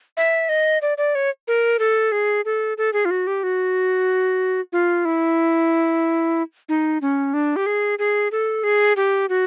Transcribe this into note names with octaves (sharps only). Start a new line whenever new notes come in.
E5
D#5
D5
D5
C#5
A#4
A4
G#4
A4
A4
G#4
F4
F#4
G4
F#4
F4
E4
D#4
C#4
D4
G4
G#4
G#4
A4
G#4
G4
F#4